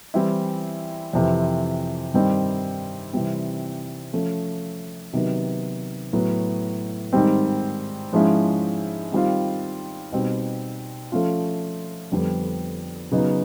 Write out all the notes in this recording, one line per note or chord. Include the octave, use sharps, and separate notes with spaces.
E3 G3 C4 E4
F2 C3 E3
G2 D#3 G3 C4 D#4
C3 E3 G3 C4
F3 A3 C#4
C3 D#3 F#3 B3
A2 F#3 B3
G#2 D#3 G3 C4
G#2 F3 G#3 C#4 E4
D#3 G3 C4 F4
B2 G3 C4 D#4
F3 A3 C#4 F4
F2 D3 G3 B3
C#3 F#3 B3 D#4